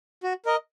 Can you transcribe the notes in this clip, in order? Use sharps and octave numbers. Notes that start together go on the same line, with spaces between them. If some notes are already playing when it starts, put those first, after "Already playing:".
F#4
A#4 D#5